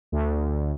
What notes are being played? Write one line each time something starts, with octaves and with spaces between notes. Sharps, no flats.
D2